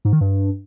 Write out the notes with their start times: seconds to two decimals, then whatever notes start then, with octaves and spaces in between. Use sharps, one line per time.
0.05 G#2
0.13 D#3
0.21 G2